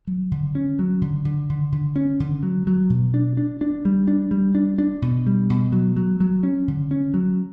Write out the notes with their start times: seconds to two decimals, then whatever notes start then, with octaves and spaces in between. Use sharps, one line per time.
0.07 F#3
0.32 D3
0.55 C#4
0.79 F#3
1.02 D3
1.25 D3
1.50 D3
1.72 D3
1.96 C#4
2.20 D3
2.43 F#3
2.67 F#3
2.90 B2
3.14 D4
3.37 D4
3.61 D4
3.85 G3
4.08 D4
4.31 G3
4.55 D4
4.78 D4
5.02 B2
5.27 G3
5.50 B2
5.72 F#3
5.97 F#3
6.20 F#3
6.43 C#4
6.68 D3
6.91 C#4
7.14 F#3